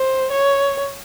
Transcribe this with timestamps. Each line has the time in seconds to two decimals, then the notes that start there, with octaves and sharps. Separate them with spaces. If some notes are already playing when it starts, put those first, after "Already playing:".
Already playing: C5
0.31 C#5